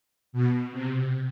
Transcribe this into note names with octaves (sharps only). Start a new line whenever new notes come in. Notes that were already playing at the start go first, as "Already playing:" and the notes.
B2
C3